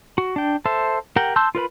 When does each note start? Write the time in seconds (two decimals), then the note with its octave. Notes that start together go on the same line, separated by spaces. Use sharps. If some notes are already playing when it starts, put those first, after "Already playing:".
0.18 F#4
0.36 D4 G5
0.65 A4 C5 E5
1.16 G4 A#4 F#5 G5
1.36 A5 C6 E6 G6
1.55 F4 A#4 B4 B5